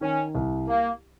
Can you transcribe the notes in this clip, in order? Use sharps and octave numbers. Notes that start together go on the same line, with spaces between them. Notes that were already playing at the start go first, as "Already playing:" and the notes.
D#3 C#4
C2
A#3